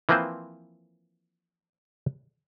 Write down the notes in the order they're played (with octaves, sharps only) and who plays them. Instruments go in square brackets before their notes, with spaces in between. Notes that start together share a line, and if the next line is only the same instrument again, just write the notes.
[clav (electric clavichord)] E3 F3 A#3 C4 B4 C5